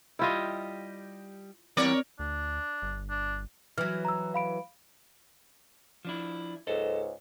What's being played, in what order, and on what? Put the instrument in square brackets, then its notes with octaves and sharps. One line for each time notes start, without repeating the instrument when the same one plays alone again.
[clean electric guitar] G3 G4 D#5 [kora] E4 F4 F5
[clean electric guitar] E3 G3 B3 [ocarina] C4 [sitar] A#4 C#5 D5
[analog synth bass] D2 [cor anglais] D4
[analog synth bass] G1
[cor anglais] D4
[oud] E3 F#3 [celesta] F6
[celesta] A#5 E6
F5 B5 D7
[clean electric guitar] F3 D4 E4
[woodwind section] C#2 G#2 [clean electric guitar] A4 C5 D#5